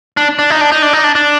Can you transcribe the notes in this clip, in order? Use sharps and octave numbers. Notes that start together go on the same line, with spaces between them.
D4
D4
D#4
D4
D#4
D4
D#4
D4
D4